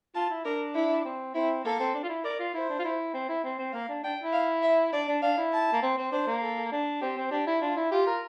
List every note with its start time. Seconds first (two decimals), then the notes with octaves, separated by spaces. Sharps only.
0.15 F4 A5
0.30 E4
0.45 D4 A#4
0.75 E4
1.05 C4
1.35 C4 E4
1.65 A#3 A4
1.80 C4
1.94 D4
2.03 F4
2.09 E4
2.24 A#4 D5
2.39 F4
2.54 E4 C5
2.69 D4
2.79 F4
2.84 E4
3.14 C4
3.29 E4
3.44 C4
3.59 C4
3.73 A#3 F5
3.88 D4
4.04 D4 G5
4.23 E4
4.33 F5
4.62 E5
4.92 D4 D5
5.08 D4
5.22 D4 F5
5.37 E4
5.53 A5
5.73 A#3
5.82 C4
5.98 C4
6.12 D4 C5
6.27 A#3
6.42 A4
6.72 D4
7.01 C4 G4
7.17 C4
7.31 D4 G4
7.47 E4
7.61 D4 F4
7.76 E4
7.91 F4 G4
8.06 A#4